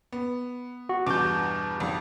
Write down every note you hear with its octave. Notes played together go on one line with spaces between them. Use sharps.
B3
F#4
E2 G2 B2 D6 G6
G#1 F2